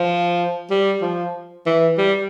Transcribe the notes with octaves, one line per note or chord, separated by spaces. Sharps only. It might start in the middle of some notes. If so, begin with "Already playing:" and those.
Already playing: F3
G3
F3
E3
G3